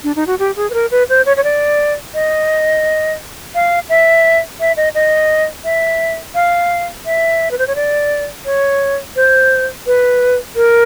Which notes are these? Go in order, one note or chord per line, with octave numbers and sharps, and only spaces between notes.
D4
D#4
F#4
G4
G#4
B4
A#4
B4
C5
C#5
C#5
D5
D#5
F5
E5
E5
D#5
D#5
E5
F5
E5
B4
C5
C#5
D5
C#5
C5
B4
A#4